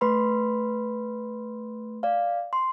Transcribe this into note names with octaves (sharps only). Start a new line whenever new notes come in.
A3 B4 B5 C6
D5 F5
C6